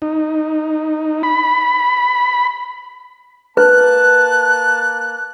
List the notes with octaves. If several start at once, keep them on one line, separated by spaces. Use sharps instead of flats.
D#4
B5
A#3 B4 A5 F#6